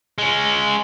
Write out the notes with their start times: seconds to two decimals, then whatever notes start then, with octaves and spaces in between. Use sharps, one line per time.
0.18 G#3 C#4